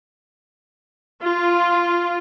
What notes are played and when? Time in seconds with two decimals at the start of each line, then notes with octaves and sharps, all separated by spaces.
1.23 F4